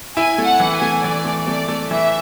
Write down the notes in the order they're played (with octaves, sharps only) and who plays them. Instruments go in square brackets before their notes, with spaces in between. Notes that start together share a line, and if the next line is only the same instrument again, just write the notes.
[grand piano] E4 [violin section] G#5
[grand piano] A3
[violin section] F#5
[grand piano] E3
[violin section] G#5
[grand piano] A3
[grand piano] E3 [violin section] D5
[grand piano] A3
[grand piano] A3 [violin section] D5
[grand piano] A3
[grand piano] E3 [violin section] E5